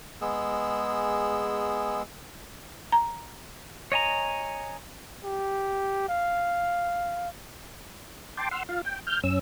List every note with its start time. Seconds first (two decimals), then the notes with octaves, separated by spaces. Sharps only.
0.21 G#3 B3 G#4 E6
2.92 A#5
3.92 C#5 D#5 G#5 A#5
5.24 G4
6.09 F5
8.37 G5 A5 C6 D6
8.51 F#5 C6 E6 F6
8.69 F4 F5
8.85 G5
9.07 F6 G6
9.24 F#2 C#4 E6